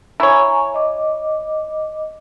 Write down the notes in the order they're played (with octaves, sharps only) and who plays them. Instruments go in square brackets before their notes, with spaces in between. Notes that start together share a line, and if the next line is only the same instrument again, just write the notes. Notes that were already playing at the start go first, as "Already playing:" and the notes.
[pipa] E4 C#5 [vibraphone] G#5 A#5 C#6
[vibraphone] D#5 D6